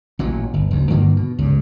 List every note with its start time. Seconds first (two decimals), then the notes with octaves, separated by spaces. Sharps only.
0.19 A1 A#2 F#3
0.54 G1
0.71 F#1 D2
0.90 G2 D3 D#3 A#3
1.17 B2
1.39 C#2 G2